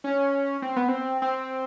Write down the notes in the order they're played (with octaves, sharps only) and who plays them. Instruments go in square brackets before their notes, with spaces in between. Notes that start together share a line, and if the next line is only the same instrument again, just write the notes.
[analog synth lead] C#4
C4
B3
C4
C4